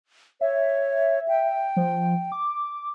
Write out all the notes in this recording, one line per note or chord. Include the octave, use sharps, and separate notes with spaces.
C#5 E5
G5
F3
D6